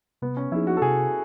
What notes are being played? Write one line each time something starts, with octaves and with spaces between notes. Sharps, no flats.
C3 B3
C#4
F3 A#3 D#4 E4 G#4
F#4
A4
C3 G#4